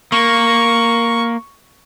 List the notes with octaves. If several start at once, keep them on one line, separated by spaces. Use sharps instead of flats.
A#3 C#6